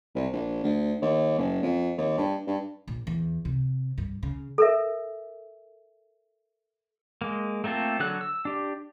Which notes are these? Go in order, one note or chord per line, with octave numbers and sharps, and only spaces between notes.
C2
A#1
D2
D#2
F#1
F2
D#2
G2
G2
A#1
E2
C3
G2
C#3
A4 A#4 E5
G#3 A#3
A3 A#3 C4 F4 A4
D3 F#3 A4 F#6
E6
D4 G4